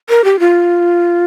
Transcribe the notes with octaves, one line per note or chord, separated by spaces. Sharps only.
A#4
G4
F4